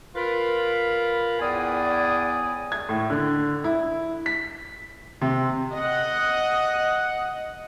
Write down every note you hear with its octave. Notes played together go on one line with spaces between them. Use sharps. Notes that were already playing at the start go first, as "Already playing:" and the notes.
F4 A#4 B4 B5
E2 A2 E4 D5 G#5 D#6
G#6
A2
D3
E4
B6
C3
D#5 F#5